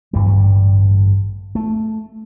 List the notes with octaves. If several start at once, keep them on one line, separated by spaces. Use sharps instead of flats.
A1 G2 D3 G3
F#3
G3
A3